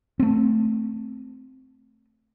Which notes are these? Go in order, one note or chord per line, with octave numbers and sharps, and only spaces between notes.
A3 C4